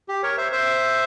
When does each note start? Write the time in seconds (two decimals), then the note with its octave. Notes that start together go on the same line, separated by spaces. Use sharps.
0.09 G4
0.23 A#4 C#5
0.37 C5 E5
0.52 C5 E5